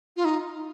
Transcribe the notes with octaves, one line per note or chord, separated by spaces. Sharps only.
F4
D#4